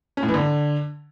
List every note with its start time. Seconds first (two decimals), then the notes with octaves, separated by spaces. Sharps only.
0.17 C#4
0.23 A2
0.28 E3
0.34 D3